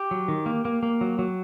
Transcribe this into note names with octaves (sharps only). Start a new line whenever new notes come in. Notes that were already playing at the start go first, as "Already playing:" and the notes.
Already playing: G4
F#3
D#3
A#3
A#3
A#3
F#3
F#3